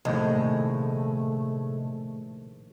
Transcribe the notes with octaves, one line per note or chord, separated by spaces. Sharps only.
A#1 D#2 A2 C3 G#3 A3